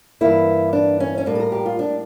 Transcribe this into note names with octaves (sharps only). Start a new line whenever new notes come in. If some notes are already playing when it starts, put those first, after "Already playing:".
G2 E3 A#3 E4
D4
C#4
C#4
A2 G3 A#3 D4
A4
A#4
G4
F4
D4